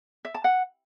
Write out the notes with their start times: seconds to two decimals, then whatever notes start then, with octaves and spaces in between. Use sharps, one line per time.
0.25 E5
0.34 A5
0.44 F#5